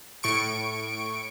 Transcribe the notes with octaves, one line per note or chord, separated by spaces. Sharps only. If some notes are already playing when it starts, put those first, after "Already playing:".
A2 C#6 D7